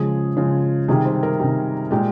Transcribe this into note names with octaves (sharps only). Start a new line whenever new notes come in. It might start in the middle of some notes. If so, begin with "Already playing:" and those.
Already playing: C#3 F3 G#3 G#4
C#3 F3 G#3
C3 D#3 G3 G#4
C5
A#4
C3 D#3 G3
A#2 G#3 G4